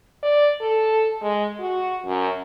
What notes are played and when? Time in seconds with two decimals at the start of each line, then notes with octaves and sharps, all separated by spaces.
0.23 D5
0.61 A4
1.21 G#3
1.60 F#4
2.06 F#2